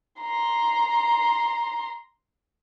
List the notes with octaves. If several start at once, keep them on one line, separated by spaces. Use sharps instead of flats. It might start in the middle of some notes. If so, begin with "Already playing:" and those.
A#5 C6